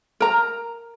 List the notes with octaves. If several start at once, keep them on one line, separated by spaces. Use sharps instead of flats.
A#4 A#5